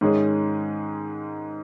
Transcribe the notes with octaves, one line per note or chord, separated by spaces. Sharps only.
G#2 D#3 G#3 C#4 G#4